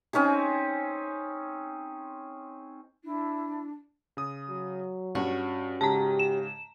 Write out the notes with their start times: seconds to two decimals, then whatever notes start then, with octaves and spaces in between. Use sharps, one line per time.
0.13 C4 C#4 D#4 G#4
3.04 D4 E4
4.17 C#3 D#6
4.49 F#3
5.15 G2 C#4 F#4
5.81 G#2 C#3 G4 A5 A#5
6.19 E7